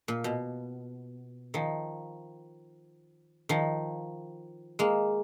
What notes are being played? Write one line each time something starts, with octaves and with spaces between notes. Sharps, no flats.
A#2
B2
D#3 F3
D#3 F3
G#3 A#3